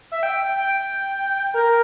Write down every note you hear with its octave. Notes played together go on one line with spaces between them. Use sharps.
E5
G5
G5
A#4